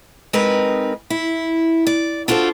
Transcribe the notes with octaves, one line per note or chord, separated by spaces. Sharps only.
G#3 C4 D#4 A#4 B4
E4
D5
D4 F4 F#4 A4 C5